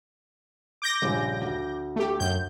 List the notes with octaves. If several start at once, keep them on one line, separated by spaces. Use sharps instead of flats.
D6 G6 A#6
A#1 G2 C#3
D2
A3 G4
F#2 G6